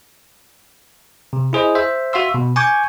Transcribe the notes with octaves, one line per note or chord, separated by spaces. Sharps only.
C3
E4 G#4 C5 D#5
C5 E5
F#4 E5 F5 C6 E6
B2
G#5 C#6 D6 G6 G#6